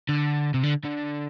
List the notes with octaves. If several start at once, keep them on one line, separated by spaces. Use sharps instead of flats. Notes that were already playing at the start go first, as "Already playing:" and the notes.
D3
C3
D3
D3